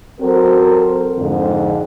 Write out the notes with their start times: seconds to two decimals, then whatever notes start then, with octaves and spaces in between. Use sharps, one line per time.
0.20 F#3 C4 F#4 A4 A#4 C5
1.18 F2 G#2 D3